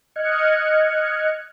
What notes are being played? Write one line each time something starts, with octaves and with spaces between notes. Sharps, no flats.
D#5 F6 F#6 G#6 C#7